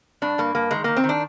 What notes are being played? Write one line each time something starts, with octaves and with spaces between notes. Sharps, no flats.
G2 D4
G2 A#3
G2 A#3
D#3 G#3
D#3 A#3
C4
D#3
D4